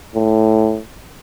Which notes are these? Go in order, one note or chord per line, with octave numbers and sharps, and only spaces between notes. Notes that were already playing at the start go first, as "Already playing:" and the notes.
A2